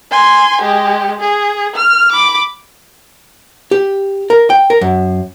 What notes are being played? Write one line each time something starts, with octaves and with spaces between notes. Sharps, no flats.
G#5 C6
G#3 G4
G#4
F6
B5 D6
G4
A#4
G5
A#4
F#2